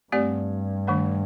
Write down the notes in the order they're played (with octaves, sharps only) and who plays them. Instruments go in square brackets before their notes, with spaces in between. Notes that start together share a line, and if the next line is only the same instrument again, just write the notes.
[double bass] G2 [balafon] A3 C4 G4 D5
[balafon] D#3 A3 D4